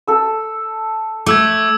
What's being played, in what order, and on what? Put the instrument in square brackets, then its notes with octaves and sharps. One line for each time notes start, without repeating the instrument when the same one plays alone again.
[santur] A4 E6
[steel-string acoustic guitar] A3 [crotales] D6 E6 G#6